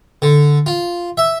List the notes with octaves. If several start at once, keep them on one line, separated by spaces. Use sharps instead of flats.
D3
F4
E5